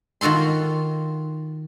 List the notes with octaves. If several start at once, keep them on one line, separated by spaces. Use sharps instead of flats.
D#3 F4 F#4 A4 C6